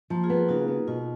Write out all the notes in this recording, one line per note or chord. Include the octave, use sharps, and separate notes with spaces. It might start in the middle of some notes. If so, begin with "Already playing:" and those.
F3 A#3
F4 G#4
B3
F#4 A#4
C#3 D#4 F#4
B3
B2 F4